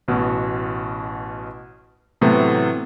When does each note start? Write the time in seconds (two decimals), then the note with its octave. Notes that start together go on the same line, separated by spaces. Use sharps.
0.08 A1 B2 F#4
2.21 A2 C3 E3 F#3 A3 B3